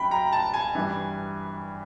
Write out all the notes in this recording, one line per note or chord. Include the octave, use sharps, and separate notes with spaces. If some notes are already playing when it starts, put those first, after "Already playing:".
Already playing: F#2 F#3 G5 B5
A#5
A5
G#5
G2 E3